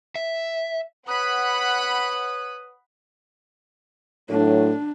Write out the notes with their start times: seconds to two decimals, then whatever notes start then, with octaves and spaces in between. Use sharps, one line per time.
0.16 E5
1.08 B4 C#5 F#5 B5 D#6 F#6
4.29 A2 F#3 D4